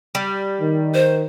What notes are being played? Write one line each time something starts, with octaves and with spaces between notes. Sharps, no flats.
G3
D#3
C5